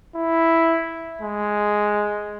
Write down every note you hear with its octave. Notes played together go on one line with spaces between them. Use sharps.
E4
G#3